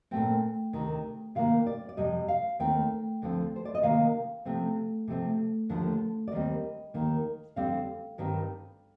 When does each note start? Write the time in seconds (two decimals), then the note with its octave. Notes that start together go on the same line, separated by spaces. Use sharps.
0.11 A#2 A3 C4 G5
0.73 D2 C3 D#3
1.35 C3 D#3 A#3 F5
1.66 D5
1.89 D5
1.97 F2 C3 G3 D#5
2.28 F5
2.59 D#2 D#3 A3 C4 G5
3.22 D2 D3 F3 C4
3.56 C5
3.65 D5
3.75 D#5
3.83 C3 D#3 A#3 F5
4.45 C3 F3 A3 C4
5.08 C3 F3 A3 C4
5.69 D#2 D3 F3 A3
6.28 D5
6.32 D#2 D#3 G3 C4 D#5
6.94 D#2 D#3 A#3
7.56 F2 D3 G3 C4 F5
8.18 G2 D#3 G3 C4